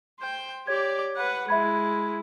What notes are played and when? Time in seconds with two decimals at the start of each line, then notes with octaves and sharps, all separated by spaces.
0.20 C5 G5
0.67 G4 C#5 D5 G#6
1.16 B4 F#5
1.48 G#3 E4 E5 B5 G#6